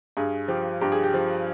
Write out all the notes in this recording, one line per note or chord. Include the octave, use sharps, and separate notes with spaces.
G2 G#4
F3 G4
G2 G4
G#4
G4
F3